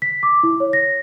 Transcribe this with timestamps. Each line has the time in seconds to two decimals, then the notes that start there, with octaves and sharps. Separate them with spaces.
0.02 B6
0.23 D6
0.43 E4
0.60 C#5
0.73 A#6